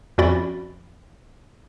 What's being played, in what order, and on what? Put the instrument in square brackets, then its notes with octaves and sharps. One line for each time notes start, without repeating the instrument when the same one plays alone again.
[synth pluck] F2 C#4 F#4 D5 B5 A6